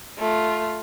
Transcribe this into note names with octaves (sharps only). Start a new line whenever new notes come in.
A3 F4